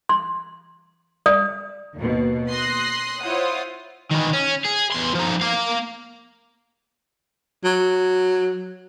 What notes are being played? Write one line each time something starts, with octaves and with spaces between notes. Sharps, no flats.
C6
D5 D#6
D#2 B2
C6 D#6 F#6 A#6 C7
E4 F4 C5 C#5 F#5 D#6
D#3 E3
C#4
G#4
E2 C6
F3 D#4
A#3 F5
F#3